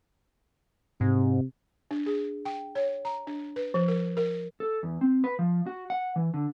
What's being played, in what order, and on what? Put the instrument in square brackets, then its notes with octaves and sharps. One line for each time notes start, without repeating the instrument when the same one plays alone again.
[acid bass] G#2 [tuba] C3
[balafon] D4
G#4
G5
C#5
A#5
D4
B4
F3
A#4
A#4
[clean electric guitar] A4
E2
C4
B4
F3
F#4
F#5
E3
D3